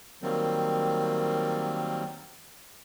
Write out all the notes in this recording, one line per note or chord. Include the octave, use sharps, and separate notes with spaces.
D#3 F#3 G3 A#3 C4